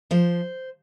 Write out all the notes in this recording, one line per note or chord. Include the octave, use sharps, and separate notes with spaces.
F3 C5